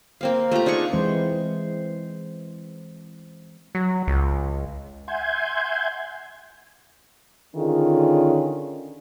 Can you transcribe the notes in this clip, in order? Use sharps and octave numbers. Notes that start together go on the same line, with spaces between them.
A#3 C4 F5
A3 F4 G4 A#5
D4 D#4 G#4 C#6
E3 G#3 C4 C5
F#3
C#2
E5 F#5 G#5 C6 G6 G#6
D3 D#3 C#4 D4 F4 G#4